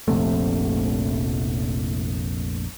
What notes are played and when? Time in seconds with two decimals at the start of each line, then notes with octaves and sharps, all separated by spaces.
0.08 F1 A#1 C3 A3